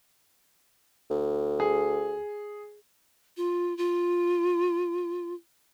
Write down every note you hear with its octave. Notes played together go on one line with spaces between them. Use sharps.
D2
G#4
F4
F4